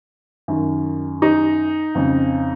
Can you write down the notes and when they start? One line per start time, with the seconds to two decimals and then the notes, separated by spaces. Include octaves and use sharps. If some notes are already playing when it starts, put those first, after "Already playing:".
0.48 F#2 D#3
1.22 D#4
1.95 F2 C#3